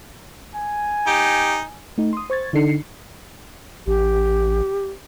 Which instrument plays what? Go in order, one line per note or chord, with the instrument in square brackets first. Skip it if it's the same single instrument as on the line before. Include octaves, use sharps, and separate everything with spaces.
[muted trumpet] G#5
[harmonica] D#4 [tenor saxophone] G4
[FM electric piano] A3 D#4
C6 D#6
C5 C#6 G#6 A6
D3 D4 D#4 A4 C7 C#7
[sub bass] A1 [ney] G4